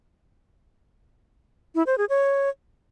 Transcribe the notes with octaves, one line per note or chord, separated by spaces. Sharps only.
E4
C5
G#4
C#5